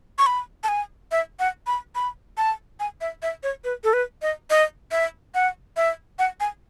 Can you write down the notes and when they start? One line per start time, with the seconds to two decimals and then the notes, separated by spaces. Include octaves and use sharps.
0.18 C#6
0.26 B5
0.64 A5
0.68 G#5
1.12 E5
1.39 F#5
1.67 B5
1.95 B5
2.37 A5
2.80 G#5
3.01 E5
3.23 E5
3.43 C#5
3.64 B4
3.84 A4
3.93 B4
4.22 D#5
4.50 D#5
4.91 E5
5.35 F#5
5.77 E5
6.19 F#5
6.40 G#5